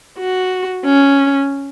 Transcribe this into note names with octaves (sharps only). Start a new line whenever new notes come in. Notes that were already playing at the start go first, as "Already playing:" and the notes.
F#4
C#4